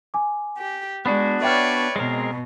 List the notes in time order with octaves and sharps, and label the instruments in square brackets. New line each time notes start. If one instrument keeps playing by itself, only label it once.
[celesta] G#5 D6
[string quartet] G4
[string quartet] G#3 [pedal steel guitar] B3 D4 F#4 [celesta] D5 B5
[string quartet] B4 C#5 D5 [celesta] E5 G5 F6
[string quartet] B2 [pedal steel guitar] G#3 C4 A#4